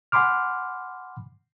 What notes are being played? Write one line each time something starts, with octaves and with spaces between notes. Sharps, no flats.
F#5 G#5 B5 C6 D6 F6